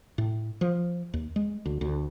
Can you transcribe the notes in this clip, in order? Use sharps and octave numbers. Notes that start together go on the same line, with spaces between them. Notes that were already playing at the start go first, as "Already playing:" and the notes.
A2
F3
D#2
G#3
D2
D2